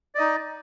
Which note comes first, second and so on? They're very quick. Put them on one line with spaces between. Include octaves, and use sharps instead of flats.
D5 D#5 D#4